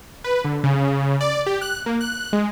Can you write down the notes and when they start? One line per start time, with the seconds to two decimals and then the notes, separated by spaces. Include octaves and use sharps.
0.24 B4
0.44 D3
0.63 C#3
1.21 D5
1.46 G4
1.61 F#6
1.86 A#3
2.01 F#6
2.33 G#3